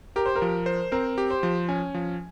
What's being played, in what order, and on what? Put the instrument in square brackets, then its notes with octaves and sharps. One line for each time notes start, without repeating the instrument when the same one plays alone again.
[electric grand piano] G4 [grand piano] A#4
[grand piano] C5
A#4
[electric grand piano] F3
C5
[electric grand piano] C4 [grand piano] A#4
[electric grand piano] G4
[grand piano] C5
[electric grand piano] F3
[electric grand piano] C#4 [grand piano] G#5
[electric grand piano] F3